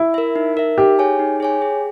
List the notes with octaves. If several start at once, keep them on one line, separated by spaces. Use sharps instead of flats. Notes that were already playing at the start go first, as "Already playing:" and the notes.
Already playing: E4
A#4 E5
D#4
A#4 E5
D#4 G4
G#4 C#5 G#5
D#4
G#4 C#5 G#5
G#4